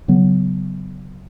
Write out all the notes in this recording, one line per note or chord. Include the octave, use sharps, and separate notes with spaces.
C#3 F#3 B3